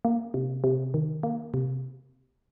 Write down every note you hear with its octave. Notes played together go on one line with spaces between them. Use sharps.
A#3
C3
C3
D#3
A#3
C3